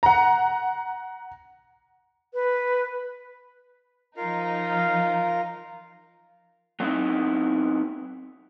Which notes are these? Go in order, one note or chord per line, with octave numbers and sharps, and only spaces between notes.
F#5 A#5
B4
F3 D#4 F4 A#4 F5
F#3 B3 C4 D#4 E4